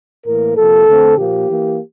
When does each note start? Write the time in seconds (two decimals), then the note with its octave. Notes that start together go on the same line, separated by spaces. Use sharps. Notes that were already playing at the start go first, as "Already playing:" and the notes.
0.25 A2 E3 A#3 A#4
0.55 C3 F3 A#3 A4
0.87 D3 A3 C4
1.17 A#2 F3 A#3 G4
1.48 E3 A#3